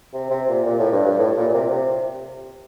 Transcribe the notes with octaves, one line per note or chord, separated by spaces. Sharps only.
C3
C3
A#2
A#2
A2
G2
G2
A2
A#2
A#2
C3
C3